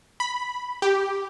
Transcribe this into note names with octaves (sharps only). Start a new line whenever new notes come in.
B5
G4